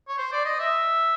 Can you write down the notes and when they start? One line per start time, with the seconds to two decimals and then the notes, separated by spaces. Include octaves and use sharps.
0.08 C#5
0.18 C5
0.32 D5
0.45 D#5
0.60 E5